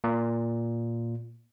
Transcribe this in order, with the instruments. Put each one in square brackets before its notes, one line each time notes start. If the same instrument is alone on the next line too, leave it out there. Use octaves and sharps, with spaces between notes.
[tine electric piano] A#2